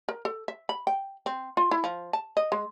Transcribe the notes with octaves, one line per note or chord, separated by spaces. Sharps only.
A#4
A4
E5
B5
G5
C4
F4
E4
F3
A5
D#5
G#3